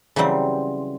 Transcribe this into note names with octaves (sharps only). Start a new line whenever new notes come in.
C#3 E3 F#3 G3 C4